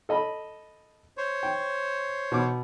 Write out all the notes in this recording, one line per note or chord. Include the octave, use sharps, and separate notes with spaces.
A4 D#5 B5
C5 C#5
G5
B2 D6